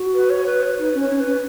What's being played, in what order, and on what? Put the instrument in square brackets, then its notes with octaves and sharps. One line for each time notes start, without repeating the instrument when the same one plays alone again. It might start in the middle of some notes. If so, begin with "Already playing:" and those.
Already playing: [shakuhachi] F#4
[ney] B4
C#5
B4
C#5
[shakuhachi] D#4 [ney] B4
[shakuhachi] C#4
[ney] C#5
[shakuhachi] C#4
[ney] B4
[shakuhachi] C#4